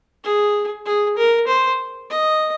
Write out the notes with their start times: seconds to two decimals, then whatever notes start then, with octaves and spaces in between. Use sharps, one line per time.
0.23 G#4
0.85 G#4
1.17 A#4
1.47 C5
2.10 D#5